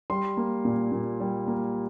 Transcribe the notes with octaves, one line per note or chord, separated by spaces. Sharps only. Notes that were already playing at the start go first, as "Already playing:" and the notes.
G3 C6
A#3
A#2
A#2
G3
A#3